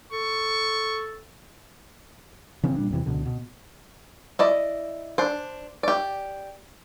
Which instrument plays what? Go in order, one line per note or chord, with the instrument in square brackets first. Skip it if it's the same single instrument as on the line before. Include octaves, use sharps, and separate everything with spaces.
[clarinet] A4 [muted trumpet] C#6
[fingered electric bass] C#3 E3 C4 C#4
A#2 G3 D4
E2 C3 E3
C#2 B2 D3
B2
[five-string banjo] E4 D5 D#5
D4 C5
G4 D5